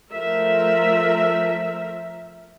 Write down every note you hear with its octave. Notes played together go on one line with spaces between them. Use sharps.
F3 A3 A#4 E5